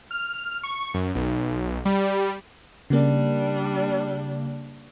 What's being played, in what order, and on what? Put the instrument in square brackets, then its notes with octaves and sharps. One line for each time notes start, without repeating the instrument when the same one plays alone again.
[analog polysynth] F6
C#6
F#2
B1
G3
[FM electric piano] C#3 A#3 [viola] G3 D4